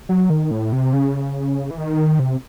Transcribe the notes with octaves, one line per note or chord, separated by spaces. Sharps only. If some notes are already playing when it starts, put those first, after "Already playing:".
F#3
D#3
A2
C3
C#3
E3
D#3
C3